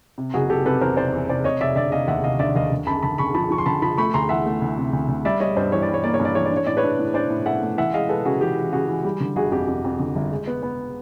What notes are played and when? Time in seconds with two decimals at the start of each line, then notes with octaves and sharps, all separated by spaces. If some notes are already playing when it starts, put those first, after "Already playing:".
0.18 C3
0.34 F#1 F#4 G#4
0.50 F#1 G4 A4
0.65 C3 A4 B4
0.81 E2 A#4 C5
0.97 C3 C5 D5
1.13 E2
1.29 C3 C5 D5
1.44 F1 C#5 D#5
1.61 F1 D5 E5
1.76 D3 D5 E5
1.92 F1 D#5 F5
2.08 D#2 E5 F#5
2.23 F1 D#5 F5
2.39 D3 D5 E5
2.55 D#2 D#5 F5
2.72 D3
2.87 F#2 A5 B5
3.03 D3 A5 B5
3.18 D3 B5 C#6
3.34 F3 A5 B5
3.51 F3 C#6
3.58 C6
3.66 D3 A5 B5
3.82 F3 A5 B5
3.98 A3 B5 C#6
4.14 D2 A#5 C6
4.29 E3 E5 F#5
4.46 A3
4.62 D2
4.77 C3
4.93 D2
5.08 D2
5.25 G3 D5 E5
5.40 G3 C#5 D#5
5.56 G2 C5 D5
5.72 E3 C#5
5.82 D5
5.88 G3
5.94 C#5
6.04 A#3 D5
6.14 C#5
6.20 G2
6.25 D5
6.35 E3 C#5
6.46 D5
6.51 D4
6.56 C#5
6.67 A2 D5
6.77 B4 C#5
6.84 D4
6.99 A2
7.14 D4 C5 D5
7.30 A2
7.46 A3 E5 F#5
7.63 A3
7.77 E3 E5 F#5
7.94 G#3 D#5 F5
8.09 G#3 A4 B4
8.25 C#3 F#4 G#4
8.41 E3 G4
8.58 E3
8.72 C#3 F#4 G#4
8.88 E3
9.04 G3 G4
9.20 D3
9.36 G1 F#4 G#4
9.52 F2 G4
9.68 F2
9.84 F2
10.00 D3
10.15 G1
10.31 G#3
10.47 B3
10.63 B3